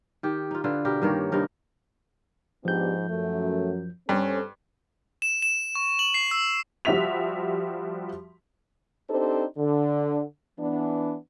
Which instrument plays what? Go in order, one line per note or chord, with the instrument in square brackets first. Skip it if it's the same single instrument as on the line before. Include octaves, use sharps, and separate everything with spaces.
[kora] D#3 G4
D#4 F4
D3 F4 B4
B2 G4 A#4
G2 D#3 A#3 C#5
G2 C3 D#4 A#4
[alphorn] G#2 [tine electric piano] F3 G6 [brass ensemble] B3 D4 G4
[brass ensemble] F#2 [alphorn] A3
[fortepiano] G2 [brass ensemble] C4 A4 [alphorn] C#4
[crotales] E7
E7
C#6
F#7
C7
E6
[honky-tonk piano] F3 G3 F#4 E5 B6 F7
[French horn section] C4 D4 D#4 G4 A4 C5
D3
E3 B3 D4